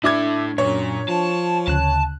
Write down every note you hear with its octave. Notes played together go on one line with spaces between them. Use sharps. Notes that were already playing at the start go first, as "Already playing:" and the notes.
A2 A3 D4 E4 D6 G#6
F#2 A#2 C#5
F3 A5
D2 C#3 A5 F#6